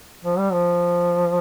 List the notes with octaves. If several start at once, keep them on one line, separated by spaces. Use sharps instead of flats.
F3
G3
F3